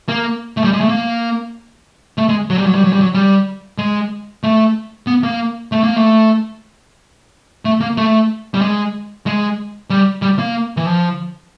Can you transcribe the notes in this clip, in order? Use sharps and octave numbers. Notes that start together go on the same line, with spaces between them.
A#3
A3
G3
G#3
A3
A#3
A3
G#3
F#3
G3
F#3
G3
F#3
G3
F#3
G3
G#3
A3
B3
A#3
A3
A#3
A3
A3
A#3
A3
G3
G#3
G#3
G3
G3
A#3
E3
F3